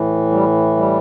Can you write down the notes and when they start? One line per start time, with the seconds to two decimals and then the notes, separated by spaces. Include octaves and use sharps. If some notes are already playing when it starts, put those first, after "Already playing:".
Already playing: A2 E3
0.31 G3
0.76 G3